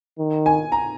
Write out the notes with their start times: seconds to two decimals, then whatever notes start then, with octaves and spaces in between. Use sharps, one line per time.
0.19 D#3
0.46 G#5
0.72 A#5